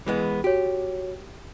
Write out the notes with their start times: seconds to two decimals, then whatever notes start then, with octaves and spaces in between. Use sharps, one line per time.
0.06 E3 G#3 B3
0.44 F#4 G4 C#5